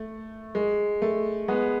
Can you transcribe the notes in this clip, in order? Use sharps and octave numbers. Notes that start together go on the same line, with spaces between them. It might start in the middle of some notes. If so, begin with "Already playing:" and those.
Already playing: A3
G#3
A3
G#3 B3